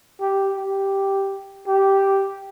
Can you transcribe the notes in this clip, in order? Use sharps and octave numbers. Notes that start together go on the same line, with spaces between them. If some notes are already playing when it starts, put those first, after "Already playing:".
G4
G4
G4